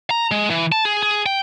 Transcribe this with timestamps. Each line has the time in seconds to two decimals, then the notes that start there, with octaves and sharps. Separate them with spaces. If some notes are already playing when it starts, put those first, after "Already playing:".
0.11 A#5
0.31 G#3
0.50 E3
0.72 A5
0.85 G#4
1.03 G#4
1.26 G5